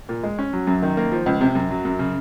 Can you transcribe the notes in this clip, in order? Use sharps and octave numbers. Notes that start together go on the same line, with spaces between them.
A#2
G#3
C#4
F#3
F#2
D#3
A#3
F3
C#2
C3
F#2
F#3
F#2
C#3